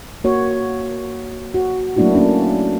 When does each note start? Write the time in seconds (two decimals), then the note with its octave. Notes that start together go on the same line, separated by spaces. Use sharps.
0.24 A#3 F#4 C#5
1.54 F#4
1.97 F#3 A3 A#3 D4 E4 F#4
2.15 A#3 C#4 D4